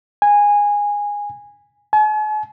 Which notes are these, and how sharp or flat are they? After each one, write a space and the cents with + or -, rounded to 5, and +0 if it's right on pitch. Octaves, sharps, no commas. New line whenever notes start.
G#5 -15
G#5 +45